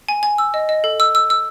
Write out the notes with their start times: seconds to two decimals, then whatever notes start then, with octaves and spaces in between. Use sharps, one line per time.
0.09 G#5
0.23 G#5
0.38 E6
0.54 D#5
0.69 D#5
0.84 A4
1.00 E6
1.15 E6
1.30 E6